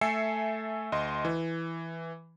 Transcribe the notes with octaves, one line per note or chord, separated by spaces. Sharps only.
A3 A4 E5 G#5 C7 C#7
D2 D#5 C6
E3